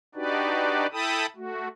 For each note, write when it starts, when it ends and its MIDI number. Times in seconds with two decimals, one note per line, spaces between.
0.15 0.87 62
0.15 0.87 63
0.15 0.87 66
0.15 0.87 67
0.15 0.87 71
0.15 0.87 74
0.92 1.26 64
0.92 1.26 69
0.92 1.26 79
0.92 1.26 81
0.92 1.26 83
0.92 1.26 87
1.36 1.68 57
1.36 1.68 66